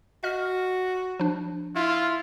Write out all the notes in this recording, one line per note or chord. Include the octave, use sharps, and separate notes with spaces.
F#4 D#5 F6
F3 D4
E4 F4